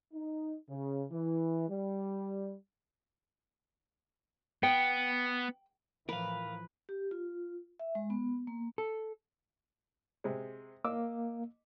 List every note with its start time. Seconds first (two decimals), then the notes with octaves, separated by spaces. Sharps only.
0.13 D#4
0.69 C#3
1.12 E3
1.69 G3
4.63 B3 G5
6.09 A2 E3 F3 A#4 B4 F5
6.89 G4
7.11 F4
7.80 E5
7.95 G#3
8.10 B3
8.47 A#3
8.78 A4
10.24 C3 G#3
10.84 A#3 D#5 D6 E6